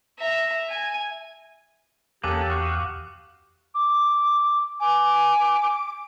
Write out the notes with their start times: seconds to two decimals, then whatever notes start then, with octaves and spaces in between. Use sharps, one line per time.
0.18 E5 A#5
0.69 G#5
2.24 E2 A#3 C#4 G4 A4 D6 D#6 F#6
2.49 F#4 F5 C#6
3.75 D6
4.80 G#5 D6